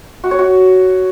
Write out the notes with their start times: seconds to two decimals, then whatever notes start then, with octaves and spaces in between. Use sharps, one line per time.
0.24 F#4
0.31 C#5
0.39 F#4